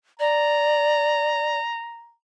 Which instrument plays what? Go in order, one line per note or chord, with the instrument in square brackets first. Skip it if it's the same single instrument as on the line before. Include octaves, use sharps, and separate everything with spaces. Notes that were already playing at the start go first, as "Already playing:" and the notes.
[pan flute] D5 [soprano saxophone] A#5